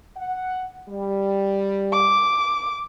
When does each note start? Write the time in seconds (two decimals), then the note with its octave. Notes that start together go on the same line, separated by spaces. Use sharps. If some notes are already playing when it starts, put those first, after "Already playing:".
0.17 F#5
0.88 G3
1.93 D6